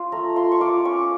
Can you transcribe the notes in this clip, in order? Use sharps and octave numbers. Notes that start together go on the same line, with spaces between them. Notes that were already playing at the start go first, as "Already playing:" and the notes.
Already playing: C#4 F4
A3 A#5
F4 C6
C#6
F4 D6
C#4 C#6